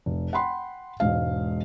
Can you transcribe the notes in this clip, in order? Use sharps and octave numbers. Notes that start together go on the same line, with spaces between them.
F1
F#5 G5 B5 C6
E1 G#2 F5